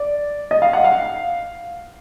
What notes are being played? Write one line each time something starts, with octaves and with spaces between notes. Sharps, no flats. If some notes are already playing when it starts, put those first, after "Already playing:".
Already playing: D5
D#5
F5
F#5
F5